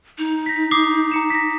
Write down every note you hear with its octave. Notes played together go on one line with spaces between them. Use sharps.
D#4
A#6 B6
D6 D#6 C7
A#5 C#7 E7
A#6 B6